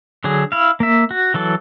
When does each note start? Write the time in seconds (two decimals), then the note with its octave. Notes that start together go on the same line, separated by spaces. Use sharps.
0.24 D3 F#3 G#4
0.52 E4 F5
0.80 A#3 E5
1.11 F#4
1.34 E3 F#3 A4